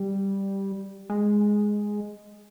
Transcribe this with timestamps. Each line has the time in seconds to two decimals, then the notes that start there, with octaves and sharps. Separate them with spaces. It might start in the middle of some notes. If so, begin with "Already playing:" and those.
Already playing: G3
1.10 G#3